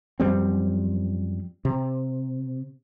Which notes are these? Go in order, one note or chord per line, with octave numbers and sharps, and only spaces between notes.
F#2 F3 G3 C4
C3